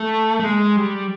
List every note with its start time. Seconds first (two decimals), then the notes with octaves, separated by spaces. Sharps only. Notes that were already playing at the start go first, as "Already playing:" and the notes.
Already playing: A3
0.40 A3
0.44 G#3
0.76 G3